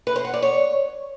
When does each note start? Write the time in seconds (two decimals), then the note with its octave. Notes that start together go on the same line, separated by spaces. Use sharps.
0.07 B4
0.16 C5
0.25 F#5
0.33 D5
0.42 C#5